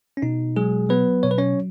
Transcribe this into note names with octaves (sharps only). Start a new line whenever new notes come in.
C#4
B2 D#4
F#3 G#3 G#4
F#3 B3 B4
B2 C#5
B4
C#4 C#5